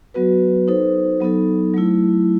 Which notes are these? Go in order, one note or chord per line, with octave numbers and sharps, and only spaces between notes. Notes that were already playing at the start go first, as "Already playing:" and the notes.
F#3 B3 F#4 B4
D#4 A4 C5
F#3 B3 D#4 A4
F#3 A3 E4